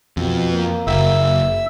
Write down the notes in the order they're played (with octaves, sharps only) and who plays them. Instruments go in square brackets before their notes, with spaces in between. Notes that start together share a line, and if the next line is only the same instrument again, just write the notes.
[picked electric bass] F2 [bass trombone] B2
[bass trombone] A#3
[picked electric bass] F#1 [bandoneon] E5 E6